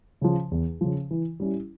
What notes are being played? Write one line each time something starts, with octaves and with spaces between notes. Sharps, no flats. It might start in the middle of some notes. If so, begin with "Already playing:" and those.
C#3 F3
E2
C#3 F3
E3
G3 C#4 E4